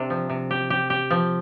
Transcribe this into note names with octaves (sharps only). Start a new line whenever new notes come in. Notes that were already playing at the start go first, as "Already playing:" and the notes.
Already playing: C3 D4
F3
C3
G4
G4
G4
F3